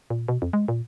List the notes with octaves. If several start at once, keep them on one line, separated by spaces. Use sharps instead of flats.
A#2
B2
F2
G#3
A#2